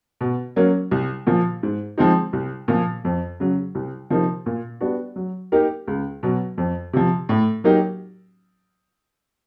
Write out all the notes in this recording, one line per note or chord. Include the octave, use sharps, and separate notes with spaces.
B2
F#3 A#3 C#4
C2
A#2 F3
G#2
F3 G#3 C4 D#4
C2
A#2 F3
F2
C#3 F#3
C2
C3 F3 A#3 D#4
A#2
G3 B3 D4 F#4
F#3
A#3 D#4 G4 A#4
C#2
B2 F#3
F2
C3 F3
A2
F#3 A#3 D#4 G4